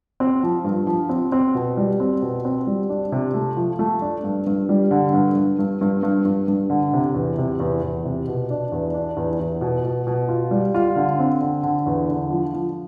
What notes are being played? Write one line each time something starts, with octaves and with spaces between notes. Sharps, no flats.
C4
F3
G2
F3
C4
C4
B2
G3
C4
B2
C4
G3
D4
C3
A3
F3
A3
D4
G2
G2
G3
D3
G2
G2
G2
G2
G2
G2
G2
D3
C3
E2
C3
E2
E2
C3
B2
D4
E2
D4
E2
E2
B2
B2
B2
F4
G3
F4
D3
C4
D3
D3
E2
D3
F3
F3